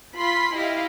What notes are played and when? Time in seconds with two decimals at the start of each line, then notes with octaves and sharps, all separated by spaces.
0.15 F4 B5 C6 B6
0.55 E4 G4 D#5 F5